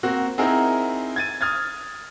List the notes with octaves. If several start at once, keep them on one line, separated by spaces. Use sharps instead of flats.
A#3 C4 F#4
C4 D#4 E4 G#4 A#4 F#5
G#6 A6 D#7
D#6 F6 G#6 A6